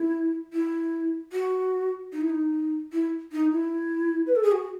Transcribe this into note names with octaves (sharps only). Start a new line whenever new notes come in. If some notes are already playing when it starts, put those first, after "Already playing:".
Already playing: E4
E4
F#4
D#4
E4
D#4
E4
D#4
E4
B4
A4
G#4
F#4